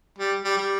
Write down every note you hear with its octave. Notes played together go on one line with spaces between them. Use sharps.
G3
G3
G3